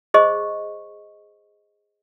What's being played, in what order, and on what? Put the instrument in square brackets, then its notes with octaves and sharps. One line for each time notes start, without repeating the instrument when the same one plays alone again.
[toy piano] G#4 C5 D#5 C#6